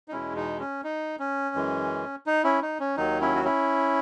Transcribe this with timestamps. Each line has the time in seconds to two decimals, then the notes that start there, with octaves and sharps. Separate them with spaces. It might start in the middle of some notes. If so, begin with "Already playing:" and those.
0.08 D#4
0.12 E2 B2 G#3 C#4 E4
0.36 D#4
0.60 C#4
0.84 D#4
1.19 C#4
1.55 F#2 E3 G#3
2.26 D#4
2.44 C#4 E4
2.62 D#4
2.80 C#4
2.97 D#2 D#3 F#3 D#4
3.21 C#4 E4
3.35 F#4
3.45 C#4 E4